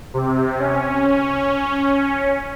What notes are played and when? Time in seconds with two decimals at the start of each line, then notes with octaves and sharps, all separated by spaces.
0.14 C3
0.59 C#4